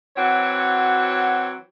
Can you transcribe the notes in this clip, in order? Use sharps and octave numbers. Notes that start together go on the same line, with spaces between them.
E3 F#3 C4 F#4 C#5